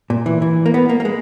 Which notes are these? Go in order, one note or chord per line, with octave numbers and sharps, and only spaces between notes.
A#2
E3
E3
A#3
B3
A#3
A#3
G#3